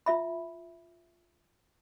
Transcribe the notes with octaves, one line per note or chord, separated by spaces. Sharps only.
F4 E5 B5